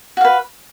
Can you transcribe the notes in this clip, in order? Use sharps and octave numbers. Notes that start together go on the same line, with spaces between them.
F#4 B4 F5